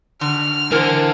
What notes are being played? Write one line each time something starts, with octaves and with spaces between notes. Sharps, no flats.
D3 F6
D3 E3 A#4 C5